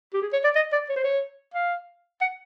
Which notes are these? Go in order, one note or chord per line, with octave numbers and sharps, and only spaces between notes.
G4
G#4
C#5
D5
D#5
D5
C#5
C5
C#5
F5
F#5